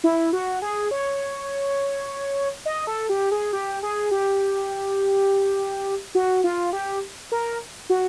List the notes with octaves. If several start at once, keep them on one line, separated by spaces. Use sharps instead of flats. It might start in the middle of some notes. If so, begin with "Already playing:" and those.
E4
F#4
G#4
C#5
D#5
A4
G4
G#4
G4
G#4
G4
F#4
F4
G4
A#4
F#4